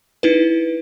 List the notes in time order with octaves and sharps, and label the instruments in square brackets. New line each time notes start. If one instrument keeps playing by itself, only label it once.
[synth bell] D#4 E4 B4